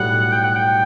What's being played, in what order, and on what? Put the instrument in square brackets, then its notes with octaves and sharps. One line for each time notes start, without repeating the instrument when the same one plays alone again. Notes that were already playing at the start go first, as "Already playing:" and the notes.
Already playing: [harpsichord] B1 A2 G3 [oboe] F#5
[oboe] G5
F#5
G5